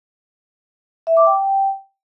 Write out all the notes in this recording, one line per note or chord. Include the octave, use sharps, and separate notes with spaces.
E5
D6
G5